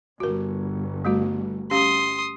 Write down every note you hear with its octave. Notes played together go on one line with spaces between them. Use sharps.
G1 F#4 A#4
G3 A3 F#4
C#4 G4 F5 C6 D#6